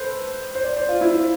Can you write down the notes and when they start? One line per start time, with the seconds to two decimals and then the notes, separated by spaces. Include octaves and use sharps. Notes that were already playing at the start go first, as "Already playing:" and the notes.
Already playing: A4 B4 C5
0.55 C5
0.64 D5
0.77 C5
0.89 F4
1.01 E4
1.10 F4
1.19 C4